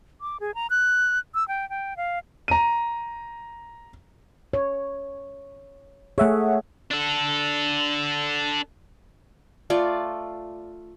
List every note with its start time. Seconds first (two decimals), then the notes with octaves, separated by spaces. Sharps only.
0.21 D6
0.40 G#4
0.55 A#5
0.70 F#6
1.34 E6
1.48 G5
1.70 G5
1.97 F5
2.48 A#5 D#7
4.53 C#5
6.18 A3 G#4 C#5 E5 F#5
6.91 D4 A4
9.70 A3 F4 D5